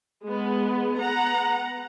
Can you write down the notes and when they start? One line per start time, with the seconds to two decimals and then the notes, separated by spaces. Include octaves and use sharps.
0.24 G#3 B3
0.99 B3 F#5 A#5